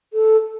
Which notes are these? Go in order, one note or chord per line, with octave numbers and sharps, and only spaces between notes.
A4